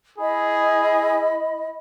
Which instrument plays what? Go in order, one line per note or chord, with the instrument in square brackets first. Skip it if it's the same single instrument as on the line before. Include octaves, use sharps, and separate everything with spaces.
[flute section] E4 D#5 B5 [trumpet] G#4